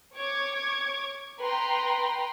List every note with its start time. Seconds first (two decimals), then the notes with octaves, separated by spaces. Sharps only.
0.16 C#5 C#6 D6 G#6
1.40 B4 G5 A#5 C6